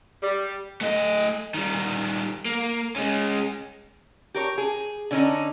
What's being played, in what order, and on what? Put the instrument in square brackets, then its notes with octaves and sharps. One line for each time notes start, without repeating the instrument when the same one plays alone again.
[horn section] G3
[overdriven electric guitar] A3 D#5
D#3 G3
A#3
G#3 C#4
[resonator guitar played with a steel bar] G4 A#4 C#5
G#4
D3 C#4 D#4